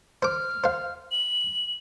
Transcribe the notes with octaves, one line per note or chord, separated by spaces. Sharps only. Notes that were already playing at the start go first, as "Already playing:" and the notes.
C5 D6 F6
C5 F5
F#7